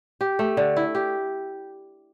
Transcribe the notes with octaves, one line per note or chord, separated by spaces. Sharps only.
G4
A3
D3
E4
G4